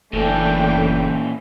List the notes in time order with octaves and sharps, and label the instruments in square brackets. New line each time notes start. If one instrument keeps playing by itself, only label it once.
[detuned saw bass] F#1 [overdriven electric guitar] A#2 C#4 [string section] E3 [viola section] A3 D4 G5